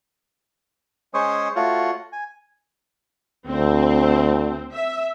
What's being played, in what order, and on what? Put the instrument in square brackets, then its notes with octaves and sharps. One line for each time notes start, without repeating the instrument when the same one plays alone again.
[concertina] G#3 C#4 C5 C#5 D#6
A3 F4 F#4 C#5
G#5
[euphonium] D2 [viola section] C4
[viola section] E5